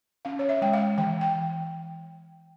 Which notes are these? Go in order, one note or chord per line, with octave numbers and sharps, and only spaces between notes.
C#4 F5
C#5
E5
G#3 G5
F5
E3 G5
G5